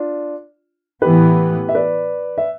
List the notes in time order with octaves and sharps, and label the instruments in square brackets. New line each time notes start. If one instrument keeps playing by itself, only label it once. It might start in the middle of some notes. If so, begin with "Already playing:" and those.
Already playing: [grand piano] D4 F4
[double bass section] A2 E3 B3 [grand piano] G4 B4
[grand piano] E5
B4 D5
E5